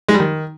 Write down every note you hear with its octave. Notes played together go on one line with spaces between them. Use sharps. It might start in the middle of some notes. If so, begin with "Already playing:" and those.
G#3
G3
D#3